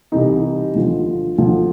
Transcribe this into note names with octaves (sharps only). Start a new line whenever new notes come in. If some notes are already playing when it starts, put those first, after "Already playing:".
C2 C3 E3 D#4
D2 D3 F3
D2 D3 F3